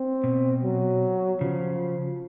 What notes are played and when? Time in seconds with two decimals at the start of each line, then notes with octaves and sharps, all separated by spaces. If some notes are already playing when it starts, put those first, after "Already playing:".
Already playing: C4
0.24 B2
0.63 F#3
1.40 C#3 F3